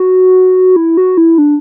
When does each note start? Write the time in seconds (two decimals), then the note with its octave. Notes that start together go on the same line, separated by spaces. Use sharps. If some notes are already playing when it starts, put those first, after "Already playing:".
Already playing: F#4
0.76 E4
0.97 F#4
1.17 E4
1.38 D4